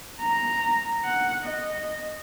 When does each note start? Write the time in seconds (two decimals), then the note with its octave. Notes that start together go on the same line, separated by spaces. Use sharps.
0.21 A#5
1.05 F#5
1.45 D#5